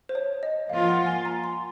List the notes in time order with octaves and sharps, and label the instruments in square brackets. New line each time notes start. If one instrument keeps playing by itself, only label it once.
[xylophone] C5
C#5
D#5
[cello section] F3 A#3 F4 [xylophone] F5
[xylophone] F#5
G#5
A#5
C6